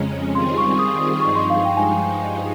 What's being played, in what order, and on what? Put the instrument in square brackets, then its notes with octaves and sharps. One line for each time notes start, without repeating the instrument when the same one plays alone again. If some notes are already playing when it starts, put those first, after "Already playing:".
Already playing: [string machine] F2 C#3 G#3 C#4 [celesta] A#5
[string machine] D#3 G3 C4 F4 G#4 [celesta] C6
[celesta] C#6
D#6
D#6
[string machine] G2 F3 G#3 D#4 [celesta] C#6
[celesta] C6
F5
G5
G#5